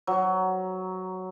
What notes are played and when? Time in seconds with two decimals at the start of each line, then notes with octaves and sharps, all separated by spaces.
0.07 F#3